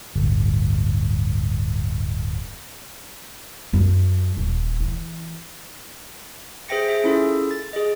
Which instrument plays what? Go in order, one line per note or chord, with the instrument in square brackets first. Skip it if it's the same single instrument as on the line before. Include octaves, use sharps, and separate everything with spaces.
[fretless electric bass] D1 G1
[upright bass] F#2
D#1
E3
[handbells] G#4 C5 E5 G5 A#6 C#7
G#4 E5
C#4 E4 F4 G#4 A4
A6
G#4 D#5